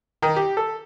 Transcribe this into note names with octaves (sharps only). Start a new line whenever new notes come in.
D#3
G4
A4